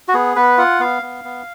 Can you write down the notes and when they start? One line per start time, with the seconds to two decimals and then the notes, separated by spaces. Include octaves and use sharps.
0.08 F#4
0.14 B3 G#4
0.36 B3 B4
0.58 F4 F#5
0.80 B3 F5
1.02 B3
1.24 B3